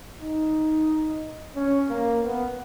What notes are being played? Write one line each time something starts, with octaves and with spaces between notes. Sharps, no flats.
D#4
C#4
A#3
B3